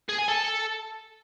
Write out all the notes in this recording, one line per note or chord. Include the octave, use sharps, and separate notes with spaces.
G#4
G#5
A4